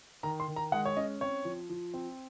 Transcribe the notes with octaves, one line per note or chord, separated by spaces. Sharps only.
D#3 A#5
C6
D#3
A#5
G#3 F#5
C#5
C#4 D#5
C4 C#5
F3
F3
C4